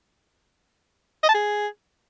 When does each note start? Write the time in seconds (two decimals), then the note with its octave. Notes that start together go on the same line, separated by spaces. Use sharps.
1.23 D#5
1.29 A5
1.34 G#4